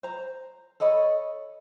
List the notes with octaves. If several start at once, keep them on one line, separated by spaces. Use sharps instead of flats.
C5 A#5
A4 C#5 D#5 B5